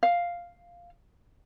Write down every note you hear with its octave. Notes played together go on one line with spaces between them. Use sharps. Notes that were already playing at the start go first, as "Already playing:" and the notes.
F5